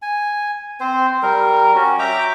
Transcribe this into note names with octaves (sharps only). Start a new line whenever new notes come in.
G#5
C4 C5
G3 A#4
C#4 F#4
E5 G5 A#5 D6